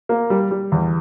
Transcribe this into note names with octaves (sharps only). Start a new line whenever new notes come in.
A#3
G3
G3
E2